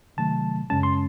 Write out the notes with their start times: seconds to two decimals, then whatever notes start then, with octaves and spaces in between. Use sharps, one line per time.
0.17 C3 D#3 F#3 A3 A5
0.70 F#2 C#3 G#3 C#4 A5
0.83 C6